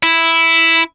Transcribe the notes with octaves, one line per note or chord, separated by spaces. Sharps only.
E4